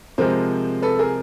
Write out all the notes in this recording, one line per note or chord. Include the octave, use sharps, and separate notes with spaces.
C3 F3 G#3 A#4 C5
A4 B4
G#4 A#4